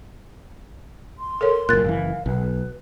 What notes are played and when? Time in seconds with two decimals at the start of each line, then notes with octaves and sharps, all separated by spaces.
1.19 C6
1.41 A4 A#4 C#5
1.69 F#1 A#2 A#4 F#6 A6
1.84 F#1 C3 E3 F5
2.26 B1 B4